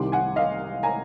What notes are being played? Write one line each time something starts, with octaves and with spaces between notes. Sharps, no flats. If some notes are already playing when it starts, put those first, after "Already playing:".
Already playing: C2 C3 D#3 C6 D6
F#5 G#5
D#5 F5
G#5 A#5